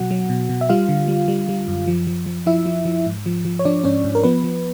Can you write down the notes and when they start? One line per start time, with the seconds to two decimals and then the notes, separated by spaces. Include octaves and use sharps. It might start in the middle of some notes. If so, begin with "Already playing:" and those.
Already playing: B2 F#3 F#4 F#5
0.11 F#3
0.29 B2
0.49 B2
0.61 E5
0.69 G3 F4 F5
0.89 D3
1.08 G3
1.28 G3
1.49 G3
1.68 F#2
1.87 F3
2.07 F3
2.26 F3
2.46 F3 E4 E5
2.66 F3
2.85 F3
3.06 G#2
3.26 F3
3.45 F3
3.59 C#5
3.65 F3 D4 D5
3.84 G#2 C#4 C#5
4.04 G#2
4.15 A#4
4.23 F3 B3 B4
4.44 F3